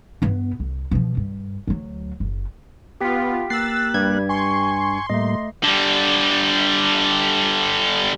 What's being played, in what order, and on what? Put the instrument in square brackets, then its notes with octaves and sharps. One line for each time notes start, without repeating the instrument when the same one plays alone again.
[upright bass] G2 B3
C2
B2 F3
G2
D2 F#3
F#1
[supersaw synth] B3 F4 [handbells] G4 G5 B6
[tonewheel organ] A#3 F#6 [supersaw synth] E6 A6 [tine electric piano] C7
[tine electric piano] G2 G#6 [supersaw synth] G3
[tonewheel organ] G#5 C#6 [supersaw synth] C6
[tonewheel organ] A2 G3 A#3 [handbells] A3 D#5
[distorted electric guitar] D3 G3